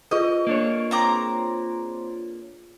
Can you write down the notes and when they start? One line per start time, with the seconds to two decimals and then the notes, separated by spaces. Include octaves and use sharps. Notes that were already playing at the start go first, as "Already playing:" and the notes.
0.11 F4 G#4 B4 D#5
0.47 A#3 D4 C#5
0.91 C4 A#5 D6